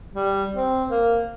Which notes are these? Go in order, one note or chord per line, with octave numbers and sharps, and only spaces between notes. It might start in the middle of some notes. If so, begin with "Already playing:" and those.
G3
C4
A#3